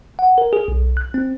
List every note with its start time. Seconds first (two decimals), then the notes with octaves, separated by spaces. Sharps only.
0.19 F#5
0.38 A#4
0.53 G#4
0.68 B1
0.97 F#6
1.14 C4